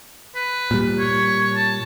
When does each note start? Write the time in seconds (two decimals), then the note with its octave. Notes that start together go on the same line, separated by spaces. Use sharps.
0.35 B4
0.71 A#2 G3
0.99 C#5
1.55 A5